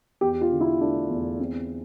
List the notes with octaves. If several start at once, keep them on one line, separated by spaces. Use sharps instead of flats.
E2 G4
F4
D3
E4
A3 D4
E2
C4